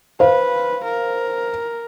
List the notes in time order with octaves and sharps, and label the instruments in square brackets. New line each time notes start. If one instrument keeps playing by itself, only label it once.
[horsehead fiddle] B4 [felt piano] C5 F5
[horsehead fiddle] A#4